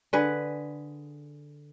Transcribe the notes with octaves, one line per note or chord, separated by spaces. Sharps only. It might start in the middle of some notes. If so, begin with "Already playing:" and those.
D3 G#4 B4